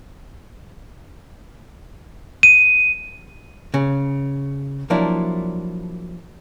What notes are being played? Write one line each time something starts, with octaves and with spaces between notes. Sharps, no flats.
D#7
C#3
F3 F#3 A#3 D4 E4